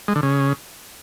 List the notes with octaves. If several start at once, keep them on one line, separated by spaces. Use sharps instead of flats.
G#3
D3
C#3